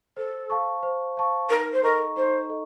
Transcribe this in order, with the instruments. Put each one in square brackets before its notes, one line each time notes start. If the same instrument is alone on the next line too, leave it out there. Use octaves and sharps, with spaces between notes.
[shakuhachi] A4 [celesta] C5
[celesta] F5 A5 C#6
C5
F5 A5 C#6
[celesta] D#4 [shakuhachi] A#4
[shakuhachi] C5
[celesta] A4 D#5 A#5 C#6 [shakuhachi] A#4
[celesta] D#4 [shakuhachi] C5
[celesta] A4 D#5